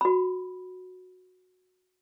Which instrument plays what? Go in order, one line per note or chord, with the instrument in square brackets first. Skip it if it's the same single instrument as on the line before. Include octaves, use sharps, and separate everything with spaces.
[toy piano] F#4 B5